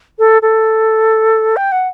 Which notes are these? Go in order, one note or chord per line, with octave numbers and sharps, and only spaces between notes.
A4
A4
G5
F#5